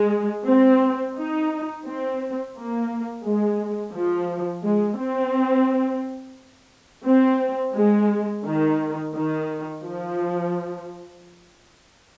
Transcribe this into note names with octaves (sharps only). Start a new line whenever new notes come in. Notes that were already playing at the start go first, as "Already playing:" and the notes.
Already playing: G#3
C4
D#4
C4
A#3
G#3
F3
G#3
C4
C4
G#3
D#3
D#3
F3